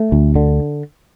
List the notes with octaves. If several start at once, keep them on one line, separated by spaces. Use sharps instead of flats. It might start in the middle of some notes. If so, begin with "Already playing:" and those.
Already playing: A3
D2
D3